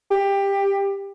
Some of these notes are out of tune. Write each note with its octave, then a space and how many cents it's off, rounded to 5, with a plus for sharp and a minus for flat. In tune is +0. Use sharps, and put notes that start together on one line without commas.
G4 +15